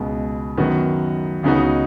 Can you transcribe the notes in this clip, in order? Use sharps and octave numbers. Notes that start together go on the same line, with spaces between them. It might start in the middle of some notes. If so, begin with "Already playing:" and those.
Already playing: C#2 B2 G#3 B3
F#2 D#3 B3 F#4
C#2 C#3 B3 D#4 F#4